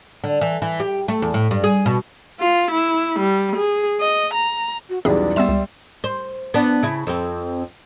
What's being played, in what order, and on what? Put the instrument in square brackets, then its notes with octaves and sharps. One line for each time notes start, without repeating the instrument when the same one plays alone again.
[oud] D3
E3
E3
G4
A3
E2
A2
G2
G#4
B2
[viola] F4
E4
G3
G#4
D#5
A#5
[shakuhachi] F#4
[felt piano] B1 E2 G3 [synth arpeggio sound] C#4 G#4 [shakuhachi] D5
[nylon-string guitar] G3 [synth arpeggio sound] B3 E6 E7 [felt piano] E5 C6
[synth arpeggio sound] C#2
[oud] C5
B3 D4
C#3 E4
F2 C4